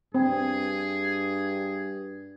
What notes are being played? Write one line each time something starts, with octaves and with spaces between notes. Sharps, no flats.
G2 C4 G#4